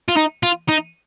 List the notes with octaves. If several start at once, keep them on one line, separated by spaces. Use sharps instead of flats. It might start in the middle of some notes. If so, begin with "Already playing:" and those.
F4
D#4
F4
D#4